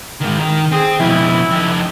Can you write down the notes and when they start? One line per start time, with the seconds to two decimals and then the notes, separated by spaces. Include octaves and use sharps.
0.21 G#2 D#3
0.38 D#3
0.72 C4 G#4
1.00 F2 B2 E4
1.51 F2 D#4